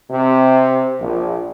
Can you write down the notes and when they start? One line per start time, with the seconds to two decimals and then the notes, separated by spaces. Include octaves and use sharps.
0.10 C3
1.00 A#1